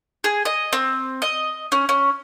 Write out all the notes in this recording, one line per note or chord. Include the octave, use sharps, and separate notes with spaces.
G#4
D#5
C4
D#5
C#4
C#4